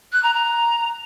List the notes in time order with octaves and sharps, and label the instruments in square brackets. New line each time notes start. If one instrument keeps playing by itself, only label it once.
[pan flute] F#6
A#5
A#5